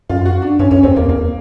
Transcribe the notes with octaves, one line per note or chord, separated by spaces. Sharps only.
F#2 F4
F#4
D4
G2 C#4
F#2 C#4
E2 C4
E2 A#3
E2 A#3